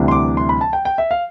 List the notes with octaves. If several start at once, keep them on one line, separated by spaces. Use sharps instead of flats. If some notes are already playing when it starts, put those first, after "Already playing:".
Already playing: D2 C3 E3 G3 D4
C6
D6
C6
B5
A5
G5
G5
E5
F5